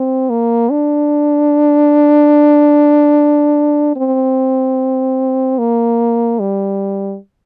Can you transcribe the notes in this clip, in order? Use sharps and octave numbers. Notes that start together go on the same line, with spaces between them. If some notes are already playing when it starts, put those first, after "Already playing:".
Already playing: C4
A#3
D4
C4
A#3
G3